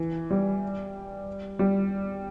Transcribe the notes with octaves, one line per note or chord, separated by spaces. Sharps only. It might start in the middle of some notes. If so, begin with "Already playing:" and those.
Already playing: E3
G3
G3